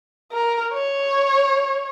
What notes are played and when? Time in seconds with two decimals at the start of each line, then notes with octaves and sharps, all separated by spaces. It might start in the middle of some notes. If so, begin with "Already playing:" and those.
0.32 A#4
0.73 C#5